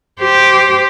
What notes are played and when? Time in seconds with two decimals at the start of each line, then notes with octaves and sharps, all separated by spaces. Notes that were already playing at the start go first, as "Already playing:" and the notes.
0.21 G4 C5